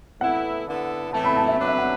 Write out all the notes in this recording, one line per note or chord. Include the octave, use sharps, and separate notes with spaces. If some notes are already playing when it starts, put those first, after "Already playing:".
A2 E3 B3 E4 A4 F#5
D3 B3 E4 A4
A2 E3 A3 A5
B5
A5
E5
F#3 D4 B4
E5
F#5